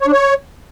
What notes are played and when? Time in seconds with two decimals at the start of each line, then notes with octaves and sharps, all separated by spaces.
0.02 C#5
0.07 D4
0.12 C#5